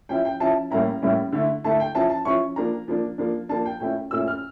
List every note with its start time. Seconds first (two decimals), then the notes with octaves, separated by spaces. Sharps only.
0.09 F3 C#4 E4 G5
0.25 G5
0.40 F3 C#4 E4 A5
0.71 A2 G3 A#3 C#4 E4 A#5
1.02 A2 G3 A#3 C#4 E4
1.32 D3 A3 E4
1.64 D3 A3 E4 A5
1.80 G5
1.95 F3 C#4 E4 A5
2.10 A5
2.25 F3 C#4 E4 C#6
2.56 F3 A#3 D4 A#5
2.88 F3 A#3 D4
3.18 F3 A#3 D4
3.49 F3 A#3 D4 A5
3.66 G5
3.80 A#2 A3 C#4 E4 G5
4.11 A#2 A3 C#4 E4 E6
4.28 F6